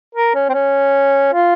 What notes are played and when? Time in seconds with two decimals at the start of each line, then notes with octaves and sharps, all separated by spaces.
0.15 A#4
0.35 C#4
0.49 C4
0.54 C#4
1.33 F4